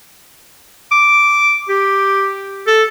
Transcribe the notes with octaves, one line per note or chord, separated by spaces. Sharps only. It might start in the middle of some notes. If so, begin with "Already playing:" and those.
D6
G4
A4